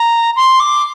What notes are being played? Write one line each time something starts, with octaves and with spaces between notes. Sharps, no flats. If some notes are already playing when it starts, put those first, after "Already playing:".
Already playing: A#5
C6
D6